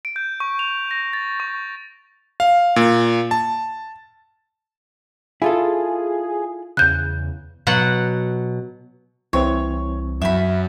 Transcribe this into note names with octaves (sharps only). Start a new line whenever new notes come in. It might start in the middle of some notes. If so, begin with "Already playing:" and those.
D7
G6
C#6
F7
A#6
A6
C#6
F5
A#2
A5
E4 F4 G#4 A4
E2 C#3 F#6 G6
B2 F#3 F#5
C2 E3 C4 C#5
F#2 E5 B5